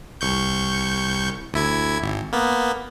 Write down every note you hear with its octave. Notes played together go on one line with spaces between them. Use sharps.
C2 C#6 G6
D2 E4 G#6
G#1
A#3 B3